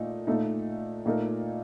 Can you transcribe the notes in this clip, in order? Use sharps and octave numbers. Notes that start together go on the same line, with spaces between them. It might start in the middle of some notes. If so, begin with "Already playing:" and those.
Already playing: A#2 A3 D#4
A#2 A3 D#4
A#2 A3 D#4 A#4